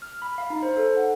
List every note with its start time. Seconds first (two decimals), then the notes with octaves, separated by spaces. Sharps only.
0.02 F6
0.22 B5
0.38 F5
0.50 D#4
0.63 C5
0.77 A4
0.97 F#5